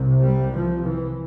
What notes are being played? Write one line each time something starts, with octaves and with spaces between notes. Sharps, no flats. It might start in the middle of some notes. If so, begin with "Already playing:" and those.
Already playing: C2 C3
G3
F3
E3